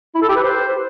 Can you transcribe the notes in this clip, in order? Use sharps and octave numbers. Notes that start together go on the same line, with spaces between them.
E4
A4
G4
B4
C5